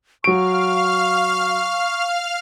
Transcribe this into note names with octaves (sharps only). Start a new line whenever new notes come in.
F#3 F5 C#6 F6 D7